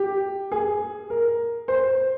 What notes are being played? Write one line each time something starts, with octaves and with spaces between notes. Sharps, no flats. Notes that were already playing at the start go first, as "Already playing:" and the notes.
Already playing: G4
G#4
A#4
C5